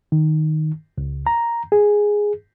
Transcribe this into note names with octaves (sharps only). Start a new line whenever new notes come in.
D#3
C#2
A#5
G#4